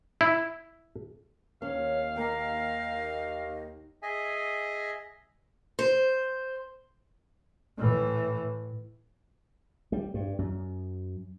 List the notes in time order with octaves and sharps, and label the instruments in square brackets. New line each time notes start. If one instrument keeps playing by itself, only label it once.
[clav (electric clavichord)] E4
[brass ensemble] D#2 [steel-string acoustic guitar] C#4 [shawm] F5
[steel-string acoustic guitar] A#3 G5 [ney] D#5
[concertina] G#4 D#5 E5 G#5
[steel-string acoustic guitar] C5
[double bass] A2 E3
[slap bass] G3
G2
F#2